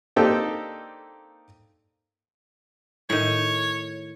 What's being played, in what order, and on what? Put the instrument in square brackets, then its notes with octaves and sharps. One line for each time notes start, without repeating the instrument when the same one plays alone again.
[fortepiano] A#3 C4 D4 D#4 G4 A4
[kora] A2 D#3 [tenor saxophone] C#5